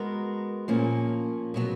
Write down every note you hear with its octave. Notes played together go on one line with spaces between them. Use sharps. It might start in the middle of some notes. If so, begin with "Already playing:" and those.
Already playing: G#3 B3 F#4 A#4
A#2 F3 A#3 C#4
B2 F#3 B3